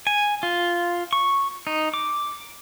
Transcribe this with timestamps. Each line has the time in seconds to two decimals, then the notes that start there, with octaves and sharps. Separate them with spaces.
0.07 G#5
0.43 F4
1.13 C#6
1.67 D#4
1.94 D6